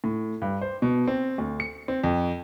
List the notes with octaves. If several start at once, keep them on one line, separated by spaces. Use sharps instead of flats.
A2
G2
C5
B2
C4
D2
C#7
C4
F2